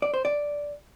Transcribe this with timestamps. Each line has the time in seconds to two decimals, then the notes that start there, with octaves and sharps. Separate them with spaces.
0.02 D5
0.14 C5
0.25 D5